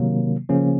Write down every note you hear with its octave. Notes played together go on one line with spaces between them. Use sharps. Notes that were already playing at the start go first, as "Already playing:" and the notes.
Already playing: C3 D#3 F#3 A#3
C#3 F3 A#3 C#4